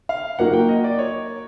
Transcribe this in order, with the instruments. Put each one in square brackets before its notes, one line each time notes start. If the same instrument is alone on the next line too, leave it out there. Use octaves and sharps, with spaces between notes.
[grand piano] F5
[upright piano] F#3 A#3 D#4 F#4 A#4 [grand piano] F#5
[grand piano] G5
D#5
D5
C#5